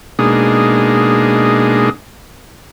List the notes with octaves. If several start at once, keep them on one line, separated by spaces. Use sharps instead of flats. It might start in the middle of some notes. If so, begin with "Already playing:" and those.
B2 G#3 A#3 D4 D#4 G#4